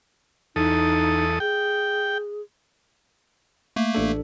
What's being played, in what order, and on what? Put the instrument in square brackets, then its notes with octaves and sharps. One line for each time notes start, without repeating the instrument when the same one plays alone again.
[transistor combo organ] E2 A4 D#6 [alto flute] D#4
[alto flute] G#4 [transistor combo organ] G5
[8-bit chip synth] A3 A#3
[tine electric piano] A1 D4 A4